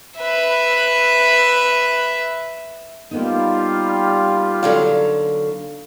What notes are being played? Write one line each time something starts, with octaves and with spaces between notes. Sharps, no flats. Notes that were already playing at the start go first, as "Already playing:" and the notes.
B4 E5
G3 A#3 B3 D#4 F4
D3 F#3 F5